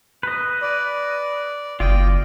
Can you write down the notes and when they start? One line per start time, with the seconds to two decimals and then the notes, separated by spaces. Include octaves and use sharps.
0.23 B4 D#5
0.62 D5
1.80 F#1 F4 D5 D#5 G5